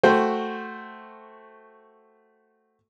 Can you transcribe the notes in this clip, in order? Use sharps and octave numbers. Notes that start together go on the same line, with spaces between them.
A3 F#4 C5 G5